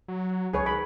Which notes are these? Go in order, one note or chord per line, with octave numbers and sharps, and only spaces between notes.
F#3
C#2 G#4 B4 C#5
D#3 B5